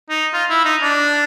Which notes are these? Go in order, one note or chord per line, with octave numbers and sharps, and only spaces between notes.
D#4
F4
E4
D#4
D4